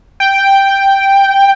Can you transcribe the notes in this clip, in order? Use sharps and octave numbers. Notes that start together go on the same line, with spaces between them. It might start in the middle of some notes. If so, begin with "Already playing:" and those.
G5